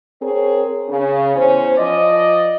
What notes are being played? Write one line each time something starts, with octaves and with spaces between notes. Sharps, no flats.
C4 G#4 A#4 C#5
C#3
E2 C#4 C5
F3 D5 D#5